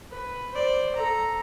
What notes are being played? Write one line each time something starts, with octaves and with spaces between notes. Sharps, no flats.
B4
C5 D5
A4 A#5